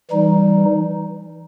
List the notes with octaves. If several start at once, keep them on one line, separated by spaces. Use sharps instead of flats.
E3 G3 D#4